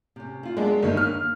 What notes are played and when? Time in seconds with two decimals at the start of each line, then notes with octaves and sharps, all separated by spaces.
0.16 C3 C#4
0.43 E4 F4
0.57 F#3 G#3 B3 D4
0.83 G1 D#3 A#3
0.97 F6